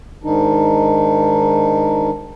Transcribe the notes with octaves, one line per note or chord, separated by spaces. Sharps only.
G#2 D#3 D4 D#4